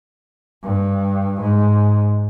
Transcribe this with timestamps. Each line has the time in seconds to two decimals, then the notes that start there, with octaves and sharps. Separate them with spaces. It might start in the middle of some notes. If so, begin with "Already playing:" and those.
0.64 G2
1.41 G#2